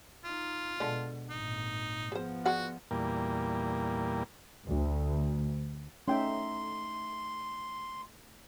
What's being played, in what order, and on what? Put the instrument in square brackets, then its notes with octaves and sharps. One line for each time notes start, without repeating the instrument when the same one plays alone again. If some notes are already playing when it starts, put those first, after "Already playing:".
[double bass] D#4 [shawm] F4
[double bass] B2 [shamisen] D3 G#3 A4
[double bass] G#1 A#2 [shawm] D#4
[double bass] F3 B3 [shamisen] G#4 C5
[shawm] F#4 [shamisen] G#4 D5 F#5
[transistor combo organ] E2 A#2 G3 A#3
[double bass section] D2
[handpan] A3 D#4 E5 [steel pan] C#4 G5 [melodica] C6